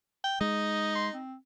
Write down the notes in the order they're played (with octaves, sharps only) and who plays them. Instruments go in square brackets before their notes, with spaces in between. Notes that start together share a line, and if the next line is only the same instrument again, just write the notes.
[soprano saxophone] G5
[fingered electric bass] G#3 [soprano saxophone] D#4 [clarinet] D#6
[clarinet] C6
C4